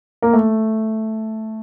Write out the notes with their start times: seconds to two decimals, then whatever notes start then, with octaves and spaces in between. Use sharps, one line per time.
0.22 A#3
0.33 A3